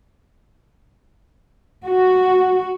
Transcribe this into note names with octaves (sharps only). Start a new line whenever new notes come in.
F#4